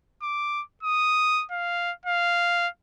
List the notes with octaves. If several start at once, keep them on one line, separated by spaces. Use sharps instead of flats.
D6
D#6
F5
F5